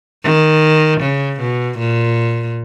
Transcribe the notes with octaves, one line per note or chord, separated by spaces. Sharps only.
D#3
C#3
B2
A#2